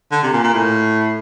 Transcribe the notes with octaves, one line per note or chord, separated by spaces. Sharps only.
D3
C3
A#2
A#2
A2